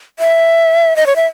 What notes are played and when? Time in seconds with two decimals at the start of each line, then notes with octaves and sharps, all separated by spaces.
0.19 E5
0.96 D#5
1.06 C#5
1.16 E5